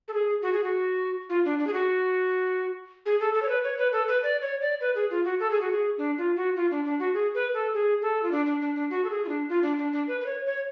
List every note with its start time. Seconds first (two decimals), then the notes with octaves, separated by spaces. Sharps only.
0.08 A4
0.14 G#4
0.42 F#4
0.53 G#4
0.64 F#4
1.29 F4
1.45 D4
1.59 D4
1.67 G#4
1.73 F#4
3.06 G#4
3.20 A4
3.34 A4
3.42 C#5
3.49 B4
3.64 C#5
3.78 B4
3.93 A4
4.08 B4
4.23 D5
4.42 C#5
4.61 D5
4.81 B4
4.95 G#4
5.10 F4
5.25 F#4
5.40 A4
5.50 G#4
5.61 F#4
5.71 G#4
5.98 D4
6.18 F4
6.36 F#4
6.56 F4
6.71 D4
6.85 D4
6.99 F#4
7.14 G#4
7.34 B4
7.54 A4
7.73 G#4
8.02 A4
8.23 F4
8.31 D4
8.46 D4
8.61 D4
8.75 D4
8.90 F#4
9.04 A4
9.10 G#4
9.24 F4
9.29 D4
9.49 F4
9.62 D4
9.78 D4
9.93 D4
10.08 B4
10.20 B4
10.26 C#5
10.46 C#5